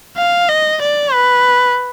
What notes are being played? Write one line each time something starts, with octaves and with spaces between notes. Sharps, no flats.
F5
D#5
D5
B4